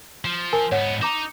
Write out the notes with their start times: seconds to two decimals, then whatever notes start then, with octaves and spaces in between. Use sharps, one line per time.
0.25 F3
0.53 A#4 G#5 A5
0.72 G#2 B3 C#5 F#5
1.02 D#4 A#5 D6 E7